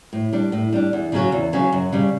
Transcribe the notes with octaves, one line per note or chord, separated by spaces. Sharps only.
A2
G3 D4
A2
G3 D4
E2
C#3 F#3 C#4 F#4
E2
C#3 F#3 C#4 F#4
F#2
C#3 G3